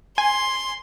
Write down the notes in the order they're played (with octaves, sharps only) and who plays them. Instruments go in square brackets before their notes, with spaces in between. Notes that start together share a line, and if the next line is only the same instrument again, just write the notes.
[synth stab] G#5 [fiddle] C6